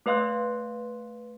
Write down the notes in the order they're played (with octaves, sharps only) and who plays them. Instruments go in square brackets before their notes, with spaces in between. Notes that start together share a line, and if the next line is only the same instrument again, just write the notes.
[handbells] A3 B4 D#5 F5 C6 F#6